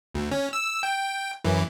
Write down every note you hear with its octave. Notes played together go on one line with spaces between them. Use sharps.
D2
C#4
E6
G5
F#2 E3